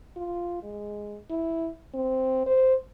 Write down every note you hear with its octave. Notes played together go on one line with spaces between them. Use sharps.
F4
G#3
E4
C4
C5